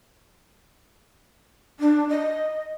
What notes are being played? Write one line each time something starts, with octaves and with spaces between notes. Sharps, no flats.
D4
D#5